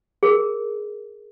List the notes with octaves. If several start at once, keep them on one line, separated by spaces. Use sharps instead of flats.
G#4 A#4